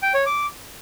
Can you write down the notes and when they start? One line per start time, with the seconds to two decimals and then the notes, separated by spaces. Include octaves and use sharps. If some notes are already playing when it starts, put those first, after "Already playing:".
0.02 G5
0.14 C#5
0.26 D6